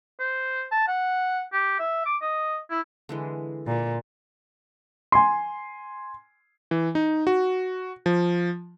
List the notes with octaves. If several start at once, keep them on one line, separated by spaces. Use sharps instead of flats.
C5
A5
F#5
G4
E5
D6
D#5
E4
D3 E3 G#3
A#2
G#5 C6
E3
D#4
F#4
F3